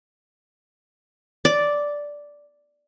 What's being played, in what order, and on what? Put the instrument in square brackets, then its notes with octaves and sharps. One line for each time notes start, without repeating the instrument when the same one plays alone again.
[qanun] D5